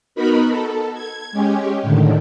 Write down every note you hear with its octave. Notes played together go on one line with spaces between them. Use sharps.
B3 D#4 F#4 A#4 B5
A4
G#6
G#3 C#4 G4
A2 D3 D#3